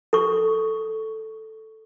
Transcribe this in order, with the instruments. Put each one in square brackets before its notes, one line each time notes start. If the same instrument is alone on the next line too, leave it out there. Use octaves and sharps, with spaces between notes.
[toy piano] A4 C#6